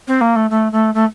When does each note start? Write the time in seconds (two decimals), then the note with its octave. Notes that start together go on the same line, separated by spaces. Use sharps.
0.08 C4
0.21 A#3
0.36 A3
0.50 A3
0.72 A3
0.94 A3